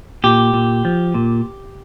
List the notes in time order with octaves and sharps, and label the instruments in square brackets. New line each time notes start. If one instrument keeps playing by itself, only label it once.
[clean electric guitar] A#2 G4
A#2
F3
A#2